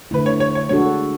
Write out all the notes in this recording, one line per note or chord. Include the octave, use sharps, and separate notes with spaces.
D3 A3 E4 B4
C#5
C#5
C#5
G#3 D4 F#4 A4 C#5